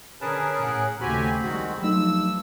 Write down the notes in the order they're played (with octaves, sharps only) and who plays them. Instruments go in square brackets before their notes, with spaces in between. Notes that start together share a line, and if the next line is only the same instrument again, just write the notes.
[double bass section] D3 [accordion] C#4 G#4 A#4 [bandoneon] B4 A5
[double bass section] A2 [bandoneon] F#5
[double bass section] D#2 C#3 A3 [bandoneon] C4 B5 [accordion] F#4 G4 G#5
[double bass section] C2 G3 [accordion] D#3 G#3 F#4
[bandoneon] G2 [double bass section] F3 [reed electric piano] F#3 A3 D#4 [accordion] E6